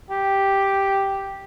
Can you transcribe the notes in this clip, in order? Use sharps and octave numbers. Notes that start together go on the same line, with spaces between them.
G4